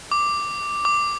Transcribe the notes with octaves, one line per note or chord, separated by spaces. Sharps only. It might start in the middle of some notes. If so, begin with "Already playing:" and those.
D6
D6